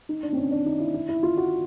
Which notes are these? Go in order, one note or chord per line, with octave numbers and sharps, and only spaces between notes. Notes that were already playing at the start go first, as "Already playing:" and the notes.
D#4
D4
C4
C#4
D4
D#4
E4
E4
E4
F4
F#4